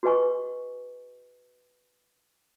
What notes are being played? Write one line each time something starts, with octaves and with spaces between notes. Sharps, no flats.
F#4 G#4 B4 D#5 G#5 C#6